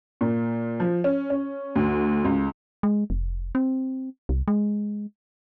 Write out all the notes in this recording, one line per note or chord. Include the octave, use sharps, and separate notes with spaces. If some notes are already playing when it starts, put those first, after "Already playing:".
A#2
F3
C#4
C#4
D2
C#2
G#3
F1
C4
C2
G#3